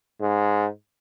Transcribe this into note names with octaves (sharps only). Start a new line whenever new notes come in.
G#2